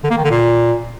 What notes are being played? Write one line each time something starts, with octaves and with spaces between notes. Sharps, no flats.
D3
A#3
D#3
D3
A#2